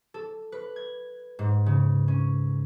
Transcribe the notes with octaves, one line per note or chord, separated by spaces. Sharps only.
A4
B4
G#6
G#2
C#3
C#4